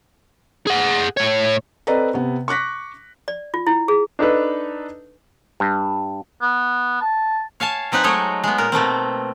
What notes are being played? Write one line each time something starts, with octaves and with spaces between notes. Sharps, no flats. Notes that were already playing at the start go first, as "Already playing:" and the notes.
G#4 F#5
A2 C#5
C4 A4 B4 D5 D#5 A#5
C3 B3
C#6 D6 F#6 A#6 B6
D5
F4
E4
G#4
D4 D#4 A4 B4
G2
B3
A5
C#5 F5 G#5 A5
F#3 C4 D#4 B4 G#5 A#5
F#3 G#3 A3 D#4 C#5 D#5
G#3 B3
A#2 A#4
B2 A3 A#3 C4